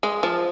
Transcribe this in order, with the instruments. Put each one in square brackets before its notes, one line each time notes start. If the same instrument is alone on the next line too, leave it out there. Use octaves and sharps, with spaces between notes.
[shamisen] G#3
F3